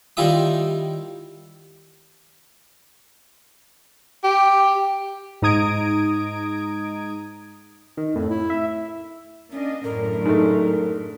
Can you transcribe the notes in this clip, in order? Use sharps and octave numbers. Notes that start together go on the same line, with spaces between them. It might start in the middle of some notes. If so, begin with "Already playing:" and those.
D#3 G3 E4 F4 E5 D#6
G4
G#2 D#4 A#5 D#6 G#6 D7
D#3
F2 A2
E4
E5
A#3 C#4 D4 D#5
F#2 A2 D3 A#4
G#2 A3